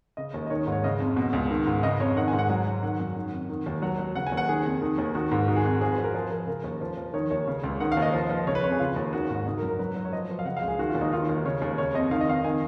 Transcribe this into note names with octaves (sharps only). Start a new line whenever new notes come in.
C#3 D#5
D#2
D#5
D#3 C#5
G#2
C#5
C#3 D#5
F2
B2
C#2
D#3
G#2
C#3 D#5
F2 C#5
D#3 F#5
G#5
G#2
F#5
F#3 G#5
F#3
D#3 F#5
F#2
D#3
F2
D#3
D#2
F#3 F#5
F#3
C#3 F#5
G#5
D#2
F#5
D#3 G#4
F2
D#3
D#2
D#3 F#4
G#2
D#3 F#4
G#4
F2 F#4
F3 G#4
B4
F3
A#4
F3 G#4
F3 A#4
C#3 A#4
D#2
F3
F3
D#3 C#5
D#2 C#5
C#3
C#2
D#3 F#5
F5
D#2
D#5
F3
F3
C#3 C#5
B4
F2 C#5
G#4
C#3 F4
D#2
D#3 F#4
G#2
C#3 D#4
A#4
F#2
A#4
F#3 B4
F#3
C#5
F3 D#5
F3
F5
C#3 F#5
F5
C#2
G#4
D#3 F#4
F4
D#2
D#4
D#3 F4
D#2
C#3 C#5
D#2
C#3 C#5
F2 D#5
D#3 F5
D#5
F2 F5
D#3 G#5